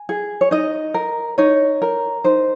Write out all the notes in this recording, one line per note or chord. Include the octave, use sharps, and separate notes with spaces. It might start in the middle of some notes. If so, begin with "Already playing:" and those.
Already playing: G#5
G#4
C#5
D#4 D#5
A#4
D#4 C#5
A#4
D#4 C5